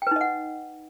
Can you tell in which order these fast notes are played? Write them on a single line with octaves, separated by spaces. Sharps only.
G5 B4 D#4 D#5 F#5